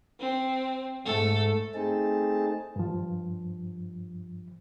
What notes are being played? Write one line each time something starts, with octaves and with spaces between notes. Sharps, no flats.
C4
G#2 A3 A4
A3 C4 D#4 G#4 A5
G2 F3